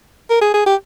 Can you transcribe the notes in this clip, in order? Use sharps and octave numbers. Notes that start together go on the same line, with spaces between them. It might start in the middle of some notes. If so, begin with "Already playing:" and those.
A#4
G#4
G#4
G4